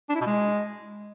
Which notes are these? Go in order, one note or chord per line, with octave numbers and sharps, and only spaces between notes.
D4
E4
B2
G#3